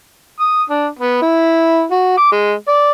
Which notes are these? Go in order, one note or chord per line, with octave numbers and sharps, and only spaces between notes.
D#6
D4
B3
E4
F#4
D6
G#3
D5